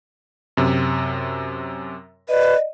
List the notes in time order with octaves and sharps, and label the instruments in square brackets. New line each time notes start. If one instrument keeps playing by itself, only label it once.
[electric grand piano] F#2 C3
[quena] B4 [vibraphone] D5 D#5